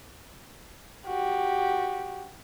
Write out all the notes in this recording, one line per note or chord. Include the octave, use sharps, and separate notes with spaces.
F#4 G4